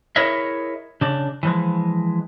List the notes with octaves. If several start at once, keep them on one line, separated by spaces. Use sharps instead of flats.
E4 G#4 A#4 C#5 D#5 E5
C#3 D4
E3 F3 G#3